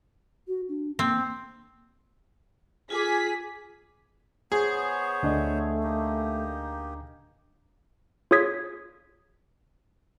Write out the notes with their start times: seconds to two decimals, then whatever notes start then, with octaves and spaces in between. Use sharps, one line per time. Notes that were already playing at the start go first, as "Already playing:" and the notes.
0.48 F#4
0.69 D4
0.99 A#3 C4
2.90 F4 G#4 G#5 D6 B6
4.52 B3 G#4 C5 C#5
5.23 D2 A3 D4 D#5
5.83 A#3 D#4 G4
8.31 F4 G#4 C#5 D#6 G#6 B6